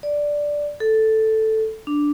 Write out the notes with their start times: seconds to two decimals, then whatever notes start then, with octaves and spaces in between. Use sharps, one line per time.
0.03 D5
0.80 A4
1.87 D4